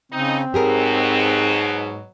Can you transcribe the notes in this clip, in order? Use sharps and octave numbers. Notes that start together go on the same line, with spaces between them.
C#3 C4 D#4
G#2 B2 F#3 G4 G#4 A#4